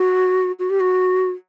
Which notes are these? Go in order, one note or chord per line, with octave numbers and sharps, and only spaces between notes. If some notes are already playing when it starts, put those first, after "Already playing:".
Already playing: F#4
F#4
G4
F#4